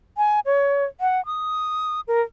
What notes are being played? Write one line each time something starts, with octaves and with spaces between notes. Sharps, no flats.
G#5
C#5
F#5
D#6
A#4